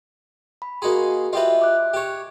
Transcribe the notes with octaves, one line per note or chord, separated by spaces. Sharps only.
B5
A#3 F#4 G#4 D#5 C6
F4 G4 B4 D#5 E5
D6 F#6
G4 C#5